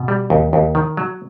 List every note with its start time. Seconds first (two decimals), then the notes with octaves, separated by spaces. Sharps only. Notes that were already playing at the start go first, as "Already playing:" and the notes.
Already playing: B2
0.08 G3
0.30 D#2
0.53 D#2
0.75 D#3
0.97 F#3